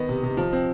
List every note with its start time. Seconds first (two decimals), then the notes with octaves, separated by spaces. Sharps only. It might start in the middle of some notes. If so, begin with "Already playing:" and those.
Already playing: D#3 B3 D#5
0.09 C3
0.23 C3
0.37 F3
0.53 C4